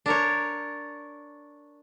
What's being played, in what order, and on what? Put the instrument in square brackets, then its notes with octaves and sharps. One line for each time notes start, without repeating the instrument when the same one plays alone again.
[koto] D4 A#4 C#5